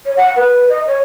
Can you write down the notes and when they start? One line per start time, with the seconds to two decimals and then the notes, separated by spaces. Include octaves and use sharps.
0.05 C#5
0.16 F#5
0.36 B4
0.69 D#5
0.87 C#5